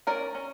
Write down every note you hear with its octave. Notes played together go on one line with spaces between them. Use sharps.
C#4 A#4 D5
C#4